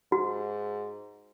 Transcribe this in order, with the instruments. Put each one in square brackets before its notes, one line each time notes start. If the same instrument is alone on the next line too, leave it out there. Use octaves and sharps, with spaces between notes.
[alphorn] G#2 [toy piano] F#4